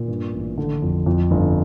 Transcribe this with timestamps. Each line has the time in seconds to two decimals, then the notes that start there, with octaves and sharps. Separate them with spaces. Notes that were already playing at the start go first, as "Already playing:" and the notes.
Already playing: A#2
0.08 G2
0.33 A1
0.58 D3
0.82 F2
1.06 F2
1.31 G1